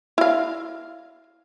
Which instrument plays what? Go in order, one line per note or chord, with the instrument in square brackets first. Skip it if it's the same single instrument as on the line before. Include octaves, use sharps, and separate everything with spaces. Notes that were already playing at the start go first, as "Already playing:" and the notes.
[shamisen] E4 F5